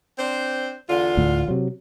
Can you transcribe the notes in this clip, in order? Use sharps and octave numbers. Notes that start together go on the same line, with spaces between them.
C4 D4 C5
E2 D3 F4
D2 A2
C3 F#3